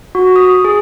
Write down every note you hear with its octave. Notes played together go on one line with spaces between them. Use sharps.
F#4
D#6
G#4